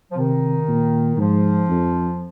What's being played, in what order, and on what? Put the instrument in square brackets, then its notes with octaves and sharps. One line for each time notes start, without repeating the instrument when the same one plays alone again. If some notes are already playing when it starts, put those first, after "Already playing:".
[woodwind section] F3
[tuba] C3 [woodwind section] D#3
[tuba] A#2
[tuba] G#2 [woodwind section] F3
[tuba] F2